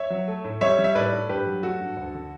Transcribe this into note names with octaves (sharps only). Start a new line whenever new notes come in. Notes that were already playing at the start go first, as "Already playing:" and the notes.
Already playing: C#5 E5
F#3
A3
A2
G3 C#5 E5
G3
E5
A2 B4 D5
A2
G2 G4 B4
F#3
A3 F#4 A4
G2
D2
D3